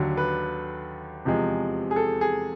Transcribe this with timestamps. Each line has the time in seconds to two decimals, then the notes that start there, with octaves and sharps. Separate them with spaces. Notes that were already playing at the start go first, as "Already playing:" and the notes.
Already playing: D#2 D3 F#3
0.17 B4
1.25 E2 C3 F3 G#3
1.91 G#4
1.96 A4
2.21 G#4